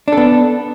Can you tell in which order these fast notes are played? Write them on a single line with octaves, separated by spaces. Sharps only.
D4 A4 B3